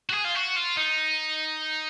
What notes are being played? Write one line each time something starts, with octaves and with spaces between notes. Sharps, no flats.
F#4
G#4
F4
F#4
F4
D#4